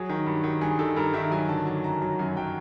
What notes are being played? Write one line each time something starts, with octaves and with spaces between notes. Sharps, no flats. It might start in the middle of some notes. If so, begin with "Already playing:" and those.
Already playing: F#3 G#4
D#3
G2
D#3
G2 G#4
D#3 A4
G2 A#4
D#3 E5
F#3 G#5
D3 A5
F#3 A5
F#2 A#5
F#3 A#5
F#2 G#5
F#3 G5